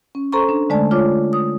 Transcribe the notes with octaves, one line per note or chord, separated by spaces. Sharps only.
C#4
A4 C5 A#5 C6 C#6
D4
D3 G#3 A3 D5 A5
F4 C#5 D6
D#6